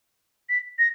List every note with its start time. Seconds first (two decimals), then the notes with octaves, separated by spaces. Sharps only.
0.49 B6
0.78 A#6